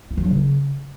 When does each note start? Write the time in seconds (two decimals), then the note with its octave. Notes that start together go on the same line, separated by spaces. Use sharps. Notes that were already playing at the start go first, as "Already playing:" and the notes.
0.11 E4
0.17 F#3
0.24 D4
0.31 C#3